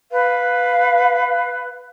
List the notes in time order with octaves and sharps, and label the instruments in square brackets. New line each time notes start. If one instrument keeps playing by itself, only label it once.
[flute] B4 [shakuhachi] F5